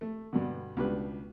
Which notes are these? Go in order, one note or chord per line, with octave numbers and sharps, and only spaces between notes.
A3
G2 B2 D3
C#2 B2 G3 D4 B4